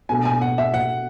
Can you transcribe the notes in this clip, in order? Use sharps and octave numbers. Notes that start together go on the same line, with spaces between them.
B2 A3 D4 G#5
G#5
F#5
E5
F#5